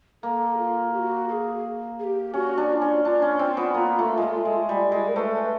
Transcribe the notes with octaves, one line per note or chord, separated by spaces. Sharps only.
A#3 A4
F4
G4
F#4
A4
G#4
G#4
G4
C#4 F#4
D4
F#4
F4
C#4
D4 F4
C#4
C4
B3
A#3
A3
G#3 A3
G#3
G3
G#3
A#4
A3 B4 C5